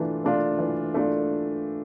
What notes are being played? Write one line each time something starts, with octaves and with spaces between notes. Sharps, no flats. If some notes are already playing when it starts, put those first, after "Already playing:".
Already playing: E3 A3 D4 F4
A3 D4 F4
E3
A3 D4 F4